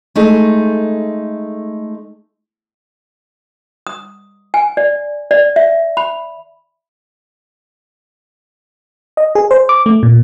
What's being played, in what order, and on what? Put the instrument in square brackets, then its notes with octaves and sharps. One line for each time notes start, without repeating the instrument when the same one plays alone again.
[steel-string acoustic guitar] G#3 A3 D#4
[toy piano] D#6
G#5
D5
D5
E5
B5
[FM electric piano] D#5
G#4
C5
D6
A3
A#2